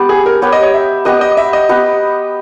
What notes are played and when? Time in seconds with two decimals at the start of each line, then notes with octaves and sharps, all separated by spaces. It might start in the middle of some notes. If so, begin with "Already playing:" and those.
Already playing: B3 G4 B4
0.09 G#4
0.26 A#4
0.42 B3 G4 B4 C#5
0.52 D#5
0.63 C#5
0.74 E5
1.05 B3 G4 B4 D#5
1.21 D#5
1.37 E5
1.53 D#5
1.69 B3 G4 B4